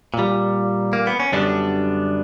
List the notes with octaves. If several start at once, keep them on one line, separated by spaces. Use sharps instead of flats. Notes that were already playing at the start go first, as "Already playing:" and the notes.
A#2 G3
A#3
B3
C#4
F#2 D3 G3 B3 D4